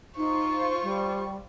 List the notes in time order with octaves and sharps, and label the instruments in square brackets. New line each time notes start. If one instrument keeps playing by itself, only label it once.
[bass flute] D#4 [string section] F4 C5 [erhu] C#6
[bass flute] G3